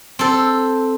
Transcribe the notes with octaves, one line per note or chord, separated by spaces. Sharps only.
C4 A4